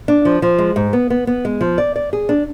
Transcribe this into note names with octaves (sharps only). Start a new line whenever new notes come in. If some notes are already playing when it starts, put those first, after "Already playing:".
D4
F3
F3
G#3
G#2
B3
B3
B3
G#3
F3
D5
D5
G#4
D4